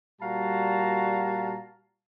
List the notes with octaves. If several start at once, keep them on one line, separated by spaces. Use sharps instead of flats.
A#2 G3 F#4 F5 A5 A#5